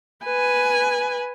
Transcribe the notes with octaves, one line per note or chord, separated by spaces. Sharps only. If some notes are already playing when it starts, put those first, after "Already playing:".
B4 G#5